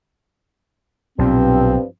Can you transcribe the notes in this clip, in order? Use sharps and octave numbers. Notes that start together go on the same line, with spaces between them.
B1 G2 A#2 F3 C4